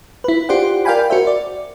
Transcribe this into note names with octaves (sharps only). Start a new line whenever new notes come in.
E4 B4
F4 G4 C5 D5 F#5
A#4 D5 F5 G5 G#5 B5
F#4 A#4 C5 E5
D5